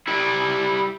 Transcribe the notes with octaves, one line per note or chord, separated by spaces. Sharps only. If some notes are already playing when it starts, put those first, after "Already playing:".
G3 E4